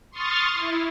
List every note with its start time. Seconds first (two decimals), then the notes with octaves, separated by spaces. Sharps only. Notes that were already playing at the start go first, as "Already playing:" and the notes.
0.11 C6 C#6 D#6 F6 A6
0.54 E4